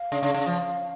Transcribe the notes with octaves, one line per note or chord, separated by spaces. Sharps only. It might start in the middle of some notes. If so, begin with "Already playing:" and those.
Already playing: F5
C#3
C#3
C#3
F3